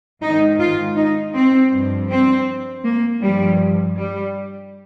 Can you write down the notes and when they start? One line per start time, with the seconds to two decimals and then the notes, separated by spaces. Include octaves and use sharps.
0.21 G#2 D#3 D#4
0.59 F4
0.96 D#4
1.34 C4
1.71 G2 F3
2.08 C4
2.83 A#3
3.21 G2 F3 G3
3.96 G3